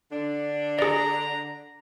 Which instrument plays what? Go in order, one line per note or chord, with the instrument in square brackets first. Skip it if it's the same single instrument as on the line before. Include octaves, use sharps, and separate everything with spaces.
[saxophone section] D3 D4
[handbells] G#4 D5 [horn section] A#5